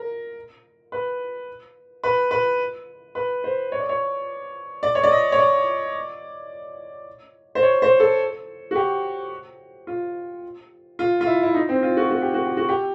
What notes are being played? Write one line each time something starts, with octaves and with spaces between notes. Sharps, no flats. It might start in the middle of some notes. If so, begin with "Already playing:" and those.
Already playing: A#4
B4
B4
B4
B4
C5
C#5
D5
C#5
D5
C#5
D5
D#5
C#5
D5
C5
C#5
C5
A4
F#4
G4
F4
F4
F4
E4
E4
D#4
C4
F4
F#4
F#4
G4
F#4
G4
F#4
G4